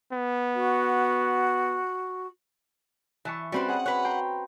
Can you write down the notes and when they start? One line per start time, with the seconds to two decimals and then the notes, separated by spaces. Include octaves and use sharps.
0.12 B3
0.55 F#4
3.25 E3 E5 A5 C#6
3.52 G3 C4 C#4 F#4 B4 C5
3.69 G#4 F#5
3.86 B4 C#5 F#6
4.05 G5 A#5 C6